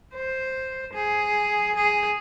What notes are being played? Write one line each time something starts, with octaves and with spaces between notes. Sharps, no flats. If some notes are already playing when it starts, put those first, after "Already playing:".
C5
G#4
G#4